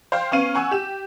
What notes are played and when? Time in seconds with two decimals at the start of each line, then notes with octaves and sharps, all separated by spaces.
0.12 C5 F5 G5
0.31 B3 C#4 F5 D#7
0.55 F#5 G#5 C#6 E6
0.71 G4 E7